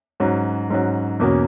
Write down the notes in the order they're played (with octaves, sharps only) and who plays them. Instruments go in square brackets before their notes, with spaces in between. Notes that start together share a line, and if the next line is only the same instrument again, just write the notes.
[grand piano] G#2 F#3 C#4 F#4
G#2 F#3 C#4 F#4
E2 B2 A#3 C#4 F#4